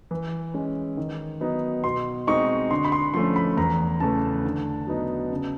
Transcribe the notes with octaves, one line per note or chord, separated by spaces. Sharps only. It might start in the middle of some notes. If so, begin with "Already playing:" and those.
E3
G#3 C#4
D#3
F#3 B3 D#4
B2 C6
G#3 C4 D#4 C#6
D3 C6
B5
C6
F3 A3 C#4 C6
B5
E2 A#5
C#3 E3 A3 A5
D3
F#3 B3 D#4
C#3